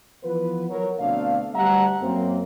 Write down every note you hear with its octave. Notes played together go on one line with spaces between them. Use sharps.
E3 F3 B3 F4 B4
F3 F#3 A#4 C#5
D2 B2 A3 C4 D4 F5
D2 G3 D4 E5 F#5 A#5
F#2 A#3 C4